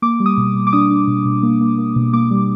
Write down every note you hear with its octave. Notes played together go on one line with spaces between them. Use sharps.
A#3 D6
G3
D#6
B2
B2
D6
D4 D#6
D4
B2
B2
A#3
A#3
A#3
B2
A#3 D6
G3